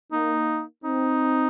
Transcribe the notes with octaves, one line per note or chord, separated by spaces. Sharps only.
A#3 D#4
C4 D#4